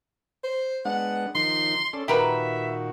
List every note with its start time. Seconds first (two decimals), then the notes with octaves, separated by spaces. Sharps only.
0.44 C5
0.85 G#3 B3 D4 F#5
1.35 D#3 F3 D#4 C6
1.93 C#4 A4 D5
2.08 A#2 D#3 F#4 G4 A#4 B4 E5